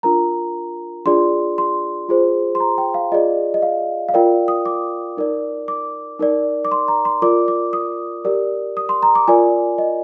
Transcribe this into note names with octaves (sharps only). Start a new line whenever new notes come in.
D4 F4 A#4 A#5
D4 F4 G#4 D5 C6
C6
F4 G#4 C5
C6
A#5
G5
F5
F4 G#4 D5 D#5
D#5
F5
F5
F4 A#4 D5 G5
D#6
D6
D#4 A#4 D5
D6
D#4 A#4 D5
D6
C6
A#5
C6
F4 A#4 D5 D6
D6
D#6
G4 A#4 D5
D#6
C6
A#5
D6
F4 A#4 D5 G#5
D#5